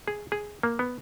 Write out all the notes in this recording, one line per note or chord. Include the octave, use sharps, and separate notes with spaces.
G#4
G#4
A#3
B3